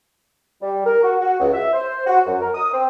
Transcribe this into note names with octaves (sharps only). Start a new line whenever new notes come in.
G3
A#4
F#4
F#4
C#2
E5
C5
F#4
F#2
A#4
D#6
C4